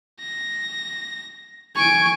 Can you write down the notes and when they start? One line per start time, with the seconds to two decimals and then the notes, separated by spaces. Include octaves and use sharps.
0.20 A#6
1.75 G#5 C#6 D7